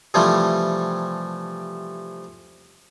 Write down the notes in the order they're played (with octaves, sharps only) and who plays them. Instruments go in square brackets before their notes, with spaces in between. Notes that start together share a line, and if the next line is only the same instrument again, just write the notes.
[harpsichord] C3 E3 F3 G3 A3